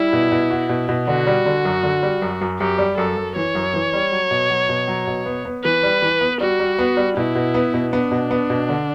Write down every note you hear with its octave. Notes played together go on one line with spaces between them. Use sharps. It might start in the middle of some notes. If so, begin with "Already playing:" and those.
Already playing: G3 E4
B2
B2
F#4
B2
B2
D3 F#4
G3
D3
F#2
D3
G3
F#2
F#2
F#2 G4
G3
F#2 A4
F#2
E3 C#5
F#2
E3
G3
F#3
B2
F#3
B2
F#3
B2
B3
B3
E3 B4
G3
E3
B3
G3 F#4
G3
B3
G3
B2 E4
B2
B3
B2
B3 D4
B2
B3
B2
D3